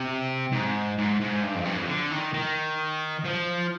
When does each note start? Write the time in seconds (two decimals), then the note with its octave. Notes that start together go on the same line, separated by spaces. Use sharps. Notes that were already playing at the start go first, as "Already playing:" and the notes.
Already playing: C3
0.52 G#2
0.98 G#2
1.20 G#2
1.42 G2
1.55 F2
1.65 G2
1.77 F2
1.88 D3
2.11 D#3
2.34 D#3
3.25 F3